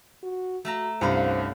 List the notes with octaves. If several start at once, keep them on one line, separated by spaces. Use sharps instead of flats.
F#4
A3 F#4 A4 A#5
C2 G2 C#4 C5 F5 F#5